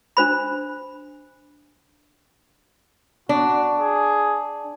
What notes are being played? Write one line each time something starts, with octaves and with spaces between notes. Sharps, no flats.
D4 C5 B5
D4 F#4
G#4